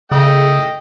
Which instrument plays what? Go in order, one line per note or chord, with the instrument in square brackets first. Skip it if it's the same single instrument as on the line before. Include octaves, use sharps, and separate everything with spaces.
[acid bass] C#3 [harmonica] A3 D#5 G5